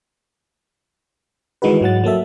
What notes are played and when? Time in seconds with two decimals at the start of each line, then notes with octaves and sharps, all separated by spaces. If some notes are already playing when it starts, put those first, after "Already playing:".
1.62 D#3 E3 G#3 D#4 F#4 B4
1.81 G#2 F#3 F#5 A6
2.04 F#3 A#3 A4 E5